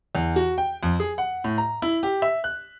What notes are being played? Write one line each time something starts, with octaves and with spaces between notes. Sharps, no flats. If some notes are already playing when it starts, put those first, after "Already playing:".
E2
F#4
G5
F2
G#4
F#5
A2
A#5
E4
G4
E5
F#6